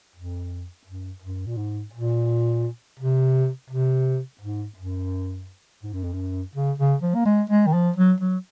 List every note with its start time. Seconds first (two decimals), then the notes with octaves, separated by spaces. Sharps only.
0.16 F2
0.87 F#2
1.23 F#2
1.47 A#2
1.57 G#2
1.94 A#2
3.00 C3
3.70 C3
4.41 G#2
4.77 F#2
5.83 G#2
5.93 F#2
6.04 F2
6.14 F#2
6.55 C#3
6.78 C#3
7.02 F3
7.15 A#3
7.26 G#3
7.50 G#3
7.67 D#3
7.74 F3
7.96 F#3
8.21 F#3